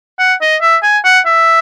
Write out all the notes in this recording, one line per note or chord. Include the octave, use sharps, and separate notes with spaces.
F#5
D#5
E5
G#5
F#5
E5